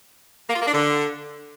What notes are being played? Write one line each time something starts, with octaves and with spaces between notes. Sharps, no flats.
A#3
F4
A#3
D4
D3